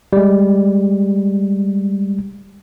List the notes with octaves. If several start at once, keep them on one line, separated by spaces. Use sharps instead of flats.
G3 G#3